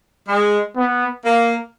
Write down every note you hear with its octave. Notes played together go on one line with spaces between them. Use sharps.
G#3
B3
A#3